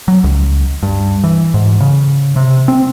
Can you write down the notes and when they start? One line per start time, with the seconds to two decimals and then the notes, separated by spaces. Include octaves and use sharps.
0.08 F#3
0.24 C#2
0.83 G2
1.24 E3
1.54 G#2
1.80 C#3
2.36 C3
2.68 C4